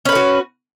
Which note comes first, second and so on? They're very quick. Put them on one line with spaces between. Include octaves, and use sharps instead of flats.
C#4 B4 A3 F#4